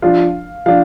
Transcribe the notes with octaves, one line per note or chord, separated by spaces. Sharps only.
F3 D4 F4 F5
F3 D4 F5